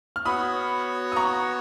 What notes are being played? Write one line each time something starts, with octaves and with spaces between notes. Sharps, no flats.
F6
B3 F#4 C#5 F#5 B5 D#6
D#6
A#5 C#6